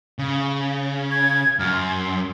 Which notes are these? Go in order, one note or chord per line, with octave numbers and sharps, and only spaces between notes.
C#3
G#6
F#2 F6
C6